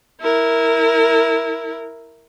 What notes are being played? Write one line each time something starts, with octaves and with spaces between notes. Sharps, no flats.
E4 A#4